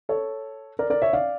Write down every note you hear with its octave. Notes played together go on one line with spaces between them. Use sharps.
A4 C#5
A#4 D5
A#4 D5
C#5 E5
D5 F5